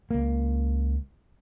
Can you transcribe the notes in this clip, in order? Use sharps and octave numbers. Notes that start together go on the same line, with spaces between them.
C#2 A#3